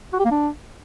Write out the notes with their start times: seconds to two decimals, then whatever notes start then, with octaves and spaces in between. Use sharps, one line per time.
0.13 F#4
0.19 G4
0.25 A#3
0.31 D4